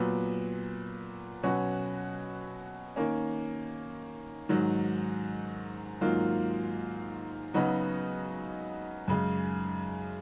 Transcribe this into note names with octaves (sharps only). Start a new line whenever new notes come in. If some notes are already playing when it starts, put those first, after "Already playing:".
Already playing: A#2 F#3 B3
B2 F#3 C#4 F#4
D#3 A#3 C#4
G#2 D#3 F#3
G#2 D#3 F#3 A#3 F4
C#3 F#3 B3 D#4 F#4
F#2 C#3 G#3